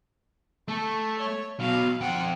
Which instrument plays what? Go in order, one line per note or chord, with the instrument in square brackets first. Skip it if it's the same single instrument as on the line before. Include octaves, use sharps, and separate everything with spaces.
[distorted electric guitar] A3 [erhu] A4
[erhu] C#5
[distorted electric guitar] B2 F#3 [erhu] F5
[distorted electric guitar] F2 G5 [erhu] F#5